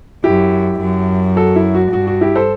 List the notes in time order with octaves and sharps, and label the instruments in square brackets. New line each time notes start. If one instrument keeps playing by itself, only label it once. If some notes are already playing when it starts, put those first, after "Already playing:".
[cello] F#2 [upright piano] E4 G4
[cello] F#2
[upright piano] F#4 A4
E4
F#4
[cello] G2 [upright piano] F#4
[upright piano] F#4
E4 G4
A4 C5